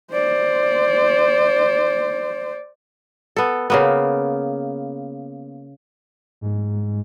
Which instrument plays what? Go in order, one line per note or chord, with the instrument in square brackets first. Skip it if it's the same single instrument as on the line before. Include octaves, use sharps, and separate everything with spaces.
[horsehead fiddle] C5 D5
[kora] B3 A4
C#3 A#3 B3
[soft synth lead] G#2